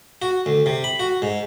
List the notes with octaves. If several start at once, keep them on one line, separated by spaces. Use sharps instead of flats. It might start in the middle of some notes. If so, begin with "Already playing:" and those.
F#4
D2
C3
B5
F#4
G#2